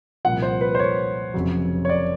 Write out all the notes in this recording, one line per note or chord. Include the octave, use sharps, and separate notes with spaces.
C2 A#2 F3 F#5
C5
B4
C5
C#5
F1 F2 C#3 F#3
C#5
D5